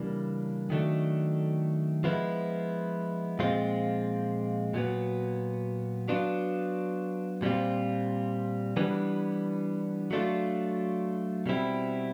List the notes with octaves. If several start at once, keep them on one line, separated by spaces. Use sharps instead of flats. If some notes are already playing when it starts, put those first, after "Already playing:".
Already playing: C#3 E3 G3 A#3 D4
D#3 F#3 A3 D4
F3 G#3 B3 E4
A#2 F3 G#3 C4 F4
A#2 F#3 B3
F#3 B3 D4 F4
A#2 G3 C4 F4
E3 G3 B3 D4
F#3 A3 D4 F4
B2 G3 C4 E4